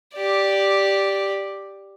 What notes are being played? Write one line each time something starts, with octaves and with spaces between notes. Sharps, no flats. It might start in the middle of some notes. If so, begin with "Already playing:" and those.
G4 D5